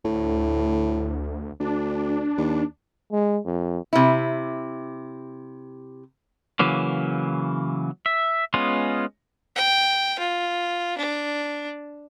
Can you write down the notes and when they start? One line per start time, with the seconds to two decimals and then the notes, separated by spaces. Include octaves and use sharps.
0.05 D2 A2
1.60 D2 D4
2.37 D#2
3.12 G#3
3.45 F2
3.93 C3 E4
6.59 C#3 E3 F#3 A#3
8.06 E5
8.54 G#3 B3 C#4 F4
9.56 G5
10.19 F4
10.98 D4